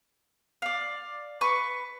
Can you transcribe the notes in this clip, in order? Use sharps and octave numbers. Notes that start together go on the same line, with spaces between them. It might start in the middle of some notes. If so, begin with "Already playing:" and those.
D5 F5
B4 C#6